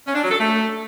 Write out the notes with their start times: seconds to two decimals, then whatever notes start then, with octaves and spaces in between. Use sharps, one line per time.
0.07 C#4
0.15 D4
0.23 F#3
0.31 A4
0.40 A3